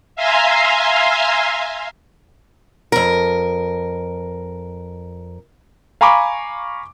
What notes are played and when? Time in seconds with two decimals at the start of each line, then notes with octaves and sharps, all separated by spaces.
0.16 E5 F5 G#5 A#5 C6
2.92 F2 A#4
6.01 F5 G#5 A#5 B5 C#6 D6